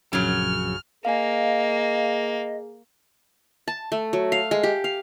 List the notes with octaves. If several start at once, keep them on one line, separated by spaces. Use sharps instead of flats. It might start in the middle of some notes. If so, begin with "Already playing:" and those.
A#1 F#2 C#3 F#3 F6
A#3 G#4 D#5 F5 G#5
A5
A3
F#3
F5
G#3
G4
F5